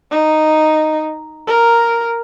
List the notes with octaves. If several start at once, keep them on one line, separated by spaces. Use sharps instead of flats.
D#4
A#4